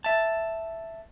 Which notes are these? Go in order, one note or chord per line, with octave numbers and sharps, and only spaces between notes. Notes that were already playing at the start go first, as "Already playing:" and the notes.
E5 A5